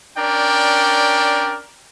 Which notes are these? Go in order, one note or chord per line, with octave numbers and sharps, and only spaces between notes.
C#4 D4 A#4 D5 G5